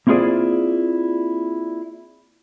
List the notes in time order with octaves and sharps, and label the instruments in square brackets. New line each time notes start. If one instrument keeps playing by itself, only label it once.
[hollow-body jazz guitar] A#3 C4 E4 F4 G#4 D5